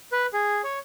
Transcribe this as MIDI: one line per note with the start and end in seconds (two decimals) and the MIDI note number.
0.12 0.26 71
0.33 0.62 68
0.64 0.79 73